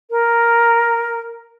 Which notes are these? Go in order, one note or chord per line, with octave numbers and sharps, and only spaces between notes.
A#4